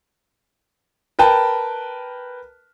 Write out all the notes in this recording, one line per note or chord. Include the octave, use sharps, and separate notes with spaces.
A#4 B4 G5 A5